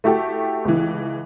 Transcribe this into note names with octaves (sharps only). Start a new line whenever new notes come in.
A3 E4 F#4 G4 A4
C#2 E3